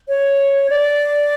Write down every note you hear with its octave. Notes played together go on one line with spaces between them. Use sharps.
C#5
D5